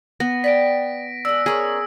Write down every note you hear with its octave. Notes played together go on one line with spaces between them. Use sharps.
B3 A#6
D5 G5 B6 D7
G#3 D4 E6
A#3 C#4 D4 G#4